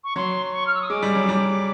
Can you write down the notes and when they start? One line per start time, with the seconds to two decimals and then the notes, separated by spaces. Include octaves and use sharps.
0.04 C#6
0.16 F#3 C6
0.52 C#6
0.67 F6
0.75 E6
0.81 D#6
0.89 G#3 D6
1.02 G3
1.15 F#3
1.29 G3